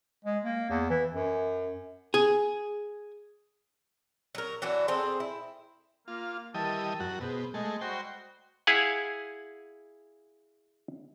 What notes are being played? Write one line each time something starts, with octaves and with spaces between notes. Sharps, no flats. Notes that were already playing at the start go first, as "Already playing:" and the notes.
G#3
A#3
E2
E3
F#2
G#4
F#3 A#4
E3 F#3 D4 F#4
C4 G#4 A4
E4
A#3 F4
D#3 E3 G3 D#5 A5
F#2 F#4
B2 G#4 C5
G#3 A3 D#5
G3 G#3 F#4 C5 G5
E4 G#4 F5 F#5 G#5